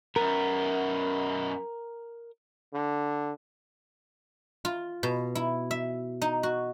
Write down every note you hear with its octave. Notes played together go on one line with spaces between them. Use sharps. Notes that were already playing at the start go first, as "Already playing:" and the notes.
F#2 B3 A#4
D3
F4
B2
E4
E5
D#4
F#4